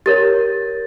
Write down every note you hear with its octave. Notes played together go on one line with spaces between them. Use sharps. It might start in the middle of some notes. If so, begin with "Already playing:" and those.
G4 A#4 C#5 A6